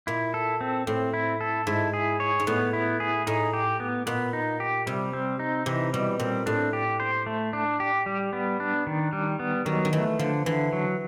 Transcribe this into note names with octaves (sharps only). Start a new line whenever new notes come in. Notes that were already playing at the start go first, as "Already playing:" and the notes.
A#2 E4
A4
C4
A2 C4
E4
A4
G#2 E4
G#4
C#5
G#2
A2 B3
E4
G#4
A2 D#4
G4
B3
A#2 B3
D#4
G4
C3 G3
C4
D#4
C3 E3
B2 G3
A#2 C4
A2 D4
G4
C5
A3
D4
G4
G3
B3
D4
D#3
G3
B3
D#3 F#3
D#3
E3 A3
D3 F3
D3 E3
F#3